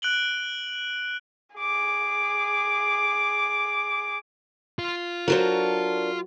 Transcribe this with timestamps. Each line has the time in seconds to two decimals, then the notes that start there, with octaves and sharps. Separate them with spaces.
0.02 F#6 D7 F#7 G7
1.56 G#4 D6
4.79 F4
5.28 F#3 D4 F#4 A4 A#4 C5